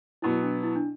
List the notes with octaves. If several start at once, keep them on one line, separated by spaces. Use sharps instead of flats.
B2 F#3 B3 E4
D4
E4
D4